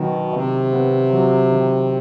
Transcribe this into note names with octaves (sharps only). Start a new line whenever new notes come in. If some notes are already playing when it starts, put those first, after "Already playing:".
Already playing: B2 D#3 F#3
C3 D#3
B3
F#3
D#3